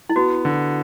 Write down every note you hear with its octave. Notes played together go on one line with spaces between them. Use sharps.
E4
B3 F#4
D3